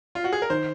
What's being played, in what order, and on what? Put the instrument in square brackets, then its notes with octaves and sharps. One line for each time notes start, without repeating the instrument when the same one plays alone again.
[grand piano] F4
F#4
G#4
A#4
[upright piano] D#3 [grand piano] C5